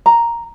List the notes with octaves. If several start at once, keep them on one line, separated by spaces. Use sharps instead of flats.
A#5